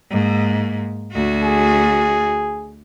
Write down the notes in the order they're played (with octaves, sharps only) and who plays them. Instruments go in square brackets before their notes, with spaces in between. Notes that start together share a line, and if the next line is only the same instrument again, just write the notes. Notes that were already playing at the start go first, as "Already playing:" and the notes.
[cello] G#2 A#3
D2 F#4
[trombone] G#4